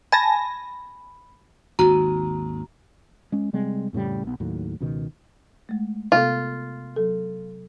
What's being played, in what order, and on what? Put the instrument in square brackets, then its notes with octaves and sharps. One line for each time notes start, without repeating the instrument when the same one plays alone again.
[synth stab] G#5 A5 A#6 [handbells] B5
[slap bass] G#1 D#2 [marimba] F#4 [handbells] A#5
[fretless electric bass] G#3 C#4
C3 G3 G#3 C4
F2 A2 C#3 G3
B1 B3
D#2 A2 F#3
C#2 B2 D#3
[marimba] G#3 A3
[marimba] C3 B3 A4 [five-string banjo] F4
[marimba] F#3 A4